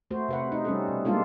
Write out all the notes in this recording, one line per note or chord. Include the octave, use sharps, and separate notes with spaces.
A3 F#4 C5
C3 B4 F#5
D#4
G3 C#4 A4
B2
G3 G#3 A#3 D4 F4 A4